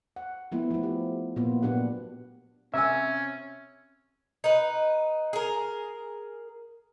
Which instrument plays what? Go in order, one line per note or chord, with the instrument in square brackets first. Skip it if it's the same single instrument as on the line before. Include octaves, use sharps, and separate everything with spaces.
[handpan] F#5
F3 A3 B3 E4
F3 A3
G4
A#2 A#3 B3 F4
A#2 F#3 B3 D4 G4 F#5
[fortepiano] C3 G#5 [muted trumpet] C#4 [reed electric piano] E5 [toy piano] F5 E6
[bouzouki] D#4 B4
G#4 A#4